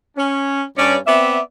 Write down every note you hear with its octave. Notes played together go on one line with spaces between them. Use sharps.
C#4
G2 C#4 D5
B3 C4 D5 E5